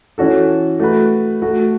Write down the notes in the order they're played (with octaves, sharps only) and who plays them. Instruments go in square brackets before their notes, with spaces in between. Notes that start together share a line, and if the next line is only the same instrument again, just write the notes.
[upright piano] E3 C#4 F#4 A4
A3 F#4 B4
A3 F#4 A4